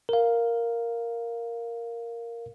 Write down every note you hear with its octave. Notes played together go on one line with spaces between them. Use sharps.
A#4 F5